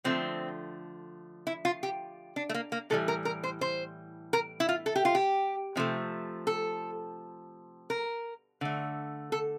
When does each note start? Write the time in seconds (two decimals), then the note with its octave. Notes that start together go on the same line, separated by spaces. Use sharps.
0.04 D3 F3 A3 C4
1.47 E4
1.65 F4
1.83 G4
2.36 D4
2.49 A3
2.54 A#3
2.72 A#3
2.90 A2 E3 G3 A4
3.08 A#4
3.25 A#4
3.43 C5
3.61 C5
4.33 A#4
4.60 E4
4.69 F4
4.86 A4
4.96 G4
5.05 F4
5.15 G4
5.76 C3 F3 A3
6.47 A4
7.90 A#4
8.61 D3 A3
9.32 A4